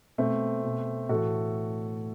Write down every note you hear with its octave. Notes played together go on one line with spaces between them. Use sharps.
B2 A3 C4
B2
A2 E3 F#4 A4